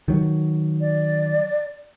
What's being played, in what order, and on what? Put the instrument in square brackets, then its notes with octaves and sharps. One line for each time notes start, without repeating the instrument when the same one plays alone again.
[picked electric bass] D#3 F#3
[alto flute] D5